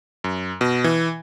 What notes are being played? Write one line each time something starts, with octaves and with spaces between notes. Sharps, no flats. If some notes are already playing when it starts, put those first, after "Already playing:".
F#2
B2
E3